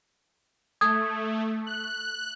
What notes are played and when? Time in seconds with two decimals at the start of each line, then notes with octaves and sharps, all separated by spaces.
0.81 A3 D#6 G#6
1.66 F#6